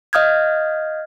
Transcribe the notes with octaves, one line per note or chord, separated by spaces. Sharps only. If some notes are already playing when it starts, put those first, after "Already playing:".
D#5 F5 D#6 F6 G6 G#6